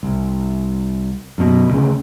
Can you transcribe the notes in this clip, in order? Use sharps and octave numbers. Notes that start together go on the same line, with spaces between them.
C2
F#2 B2
D2 C#3